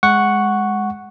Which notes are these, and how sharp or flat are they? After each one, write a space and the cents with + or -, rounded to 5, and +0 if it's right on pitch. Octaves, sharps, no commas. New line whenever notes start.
G#3 +0 F#5 +0 C#6 +0